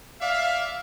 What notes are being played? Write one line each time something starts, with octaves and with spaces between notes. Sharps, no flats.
D5 E5 F5